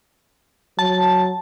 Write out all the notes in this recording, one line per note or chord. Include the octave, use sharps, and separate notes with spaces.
F#3 A5